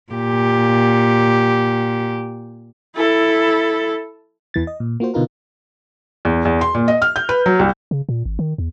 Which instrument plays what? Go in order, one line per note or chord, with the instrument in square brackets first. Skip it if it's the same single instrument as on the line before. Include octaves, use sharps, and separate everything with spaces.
[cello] A#2 G4
[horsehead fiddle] E4 A4
[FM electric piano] E2 E3 A6
D#5
A#2
A#3 F4 F#4 C5
B2 D3 D#4 F4 A#4 B4
[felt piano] E2
E2
C6
A#2
D#5
F6
G6
B4
F#3
C2
[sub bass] C#3
A#2
G#1
D#3
E2